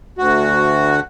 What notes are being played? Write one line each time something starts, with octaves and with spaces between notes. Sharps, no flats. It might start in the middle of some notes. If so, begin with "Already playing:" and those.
D2 F#4